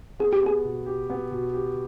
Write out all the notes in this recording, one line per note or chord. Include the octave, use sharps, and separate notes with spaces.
B3 G#4
G4
B3 G#4
B2
G4
B3
B2
G4